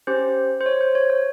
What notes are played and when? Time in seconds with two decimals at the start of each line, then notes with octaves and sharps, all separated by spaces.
0.07 C#4 G4 C5
0.61 C5
0.66 C#5
0.81 C5
0.95 C#5
1.10 C#5